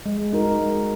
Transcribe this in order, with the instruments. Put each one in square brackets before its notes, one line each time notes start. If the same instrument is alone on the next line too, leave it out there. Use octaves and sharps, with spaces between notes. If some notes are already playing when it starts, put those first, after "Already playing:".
[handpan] G#3
D#4 F#4 A#4
G#3